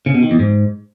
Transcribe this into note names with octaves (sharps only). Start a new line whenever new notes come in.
C#3
B2
D#3
E2
G#2